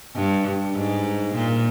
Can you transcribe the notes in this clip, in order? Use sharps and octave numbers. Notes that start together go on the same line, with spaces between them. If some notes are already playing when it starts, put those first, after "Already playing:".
G2
G#2
A#2